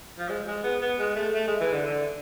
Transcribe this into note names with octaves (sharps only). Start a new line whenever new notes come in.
F3
G#3
G#3
B3
B3
G#3
A3
A3
G#3
E3
D3
D3